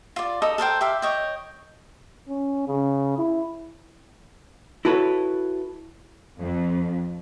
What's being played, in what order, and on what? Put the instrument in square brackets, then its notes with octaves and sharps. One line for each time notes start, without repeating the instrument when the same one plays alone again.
[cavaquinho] F4 D5
D#4 A4 D#5 A#5
A4 A#4 C5 G5
G4 E5 F5
C#5 D#5 G5
[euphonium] C#4
C#3
E4
[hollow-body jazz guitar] E4 F#4 A4 B4 C#5
[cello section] F2